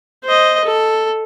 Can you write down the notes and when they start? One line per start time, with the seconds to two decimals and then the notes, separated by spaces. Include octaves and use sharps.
0.24 C5 D#5
0.65 A4